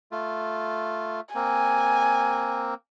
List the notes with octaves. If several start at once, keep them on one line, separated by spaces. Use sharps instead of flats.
A3 F4
A#3 C4 G#5